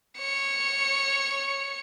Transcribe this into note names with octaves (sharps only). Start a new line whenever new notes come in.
C#5 C#7